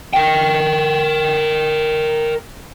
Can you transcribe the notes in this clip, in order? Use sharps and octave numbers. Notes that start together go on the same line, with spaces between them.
A#4 G5